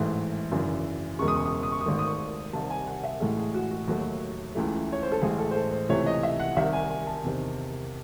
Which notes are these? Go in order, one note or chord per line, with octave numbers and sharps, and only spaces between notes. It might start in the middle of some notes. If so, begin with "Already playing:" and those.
Already playing: A1 G#2 E3 A3
G#1 F#2 C#3 E3
E1 E2 C#3 G#3 C#6
D#6
C#6
D#6
C#6
D#6
C#6
D#6
G#1 G#2 D#3 A3 C#6
D#6
C#6
C2 C3 D#3 A5
G#5
F#5
E5
A1 A2 G#3 A4
G#4
F#4
F#4
D#2 D#3 F#3 A3 F#4
C#2 C#3 E3 A3
C#5
C5
A4
A1 A2 G#3 G#4
A4
C5
A4
C5
C#2 C3 E3 A3 C#5
D#5
E5
F#5
C2 C3 D#3 E5
G#5
G#5
A5
E2 C3 D#3